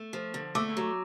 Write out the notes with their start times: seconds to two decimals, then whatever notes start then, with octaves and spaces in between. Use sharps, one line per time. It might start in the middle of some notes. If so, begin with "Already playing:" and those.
Already playing: A3
0.13 F3
0.34 D3
0.55 A3 D6 E6
0.77 F#3